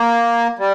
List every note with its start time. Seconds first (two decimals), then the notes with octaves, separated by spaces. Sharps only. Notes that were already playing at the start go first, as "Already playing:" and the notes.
Already playing: A#3
0.59 G3